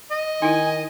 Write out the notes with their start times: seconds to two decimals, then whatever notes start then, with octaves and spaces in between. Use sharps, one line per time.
0.11 D#5
0.42 D#3 D#4 E4 G#5